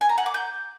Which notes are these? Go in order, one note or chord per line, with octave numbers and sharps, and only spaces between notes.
G#5
A#5
F#5
D6
G6